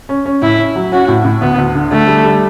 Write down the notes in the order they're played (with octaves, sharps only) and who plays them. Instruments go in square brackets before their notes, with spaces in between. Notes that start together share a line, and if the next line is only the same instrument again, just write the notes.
[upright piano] C#4
C#4
[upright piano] A2 [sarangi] E4
[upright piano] C#4
F#3
[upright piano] C#4 [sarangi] F#4
[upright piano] A2
A2
[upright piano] D2 [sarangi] B3
[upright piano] D2
D3
[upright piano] D3 [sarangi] A3
[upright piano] G3
G3